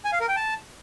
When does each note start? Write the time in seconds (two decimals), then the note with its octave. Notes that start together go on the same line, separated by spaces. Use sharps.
0.05 G#5
0.12 F5
0.20 A#4
0.28 G5
0.36 A5